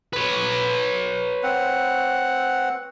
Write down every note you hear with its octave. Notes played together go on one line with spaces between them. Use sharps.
B4 C#5
C4 F#5